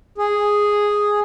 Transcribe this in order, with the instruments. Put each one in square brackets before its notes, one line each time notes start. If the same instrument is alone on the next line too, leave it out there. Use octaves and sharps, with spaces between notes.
[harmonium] G#4